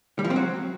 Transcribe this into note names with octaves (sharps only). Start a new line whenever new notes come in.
G3
F3
C4
F#3